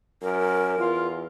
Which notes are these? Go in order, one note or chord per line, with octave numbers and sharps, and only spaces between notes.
F#2 A#4
E2 F4